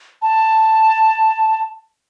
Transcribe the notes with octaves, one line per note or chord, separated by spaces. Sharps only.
A5